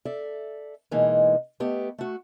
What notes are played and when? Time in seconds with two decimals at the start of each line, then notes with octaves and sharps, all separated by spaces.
0.05 A4 D5 E5
0.91 B2 E3 G#3 A#3 D#4
1.60 A3 B3 G4 D#5
1.98 A3 F#4